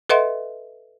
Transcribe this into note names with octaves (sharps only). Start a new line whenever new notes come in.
A4 B4 D#5 E5 F#5 C6